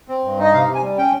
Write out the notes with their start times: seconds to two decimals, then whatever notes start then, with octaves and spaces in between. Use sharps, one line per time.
0.08 C4
0.24 G2
0.38 D#4 D#5
0.53 C3 F5
0.68 C3
0.75 G#5
0.82 G3
0.97 C#4 G5